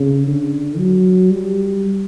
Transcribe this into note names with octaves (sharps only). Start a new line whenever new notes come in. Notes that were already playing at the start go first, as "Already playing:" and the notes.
Already playing: C#3
D3
F#3
G3